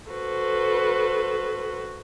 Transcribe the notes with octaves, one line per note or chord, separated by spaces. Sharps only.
F#4 A4 B4 C5